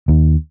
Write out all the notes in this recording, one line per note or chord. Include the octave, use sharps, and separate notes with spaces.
D#2